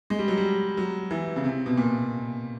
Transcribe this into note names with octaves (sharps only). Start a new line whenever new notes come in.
G#3
G3
F#3
G3
F#3
E3
C#3
C3
B2
A#2